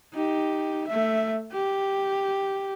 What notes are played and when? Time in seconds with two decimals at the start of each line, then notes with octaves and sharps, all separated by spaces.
0.14 D#4 G4
0.87 A3 E5
1.53 G4